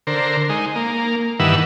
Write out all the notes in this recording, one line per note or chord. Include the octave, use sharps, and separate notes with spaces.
D3 A#4 C5
G#3 D#4
A#3
G2 D#3 E3 B4 F#5 E6